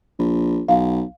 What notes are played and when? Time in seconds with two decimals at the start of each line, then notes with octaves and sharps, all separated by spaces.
0.19 A#1
0.69 B1 F5